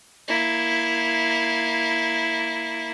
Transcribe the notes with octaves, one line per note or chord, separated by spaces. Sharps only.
A#3 E4